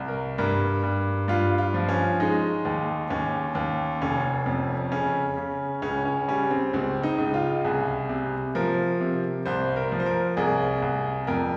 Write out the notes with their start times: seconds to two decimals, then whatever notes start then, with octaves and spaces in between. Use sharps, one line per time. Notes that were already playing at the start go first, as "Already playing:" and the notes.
Already playing: C2
0.08 A#4
0.38 G2 A#4
0.83 G2
1.28 G2 F4
1.58 F4
1.74 F3
1.89 C#4
2.20 G#3 D#4
2.65 D#2
3.10 D#2 C#4
3.55 D#2
4.01 F1 C#4
4.46 F2
4.92 C#3 C#4
5.37 C#3
5.82 C#2 C#4
6.05 C#4
6.28 G3 C#4
6.50 C4
6.73 C#2 C4
7.03 D#4
7.18 C#2
7.34 F4
7.64 C2 G#4
8.09 C3
8.55 F3 A#4
9.01 C3
9.46 C2 C5
9.76 A#4
9.92 F3
10.00 C5
10.06 A#4
10.37 C2 G#4
10.82 C2
11.27 F2 A#4